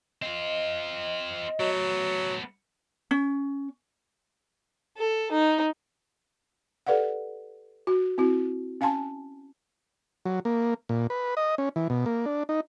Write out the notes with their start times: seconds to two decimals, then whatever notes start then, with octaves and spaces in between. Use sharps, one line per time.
0.22 C4 F4 D#5
1.60 F#3 A3 B3
3.11 C#4
4.97 A4
5.32 D#4
6.87 G4 A4 B4 D5 F5 F#5
7.87 F#4
8.18 C4 E4 F#4
8.81 C#4 F5 G#5 A5 C6
10.25 F#3
10.45 A#3
10.89 A#2
11.10 B4
11.37 D#5
11.58 C#4
11.76 E3
11.90 B2
12.06 A#3
12.26 D4
12.49 D#4